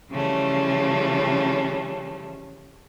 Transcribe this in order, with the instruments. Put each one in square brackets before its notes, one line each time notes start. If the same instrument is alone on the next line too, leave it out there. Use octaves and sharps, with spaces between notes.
[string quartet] C#3 E3 F3 G3 A3 C#4